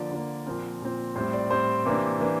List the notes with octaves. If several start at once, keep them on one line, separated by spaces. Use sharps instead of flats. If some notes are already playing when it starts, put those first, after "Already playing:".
Already playing: D3 F3 A#3 D5
D3 F3 A#3
A#2 F3 C4 A#4
A#2 F3 C4
A2 G3 C4 C5
D5
A2 G3 C4 C5
C3 E3 A#3 D4
C3 E3 A#3 D4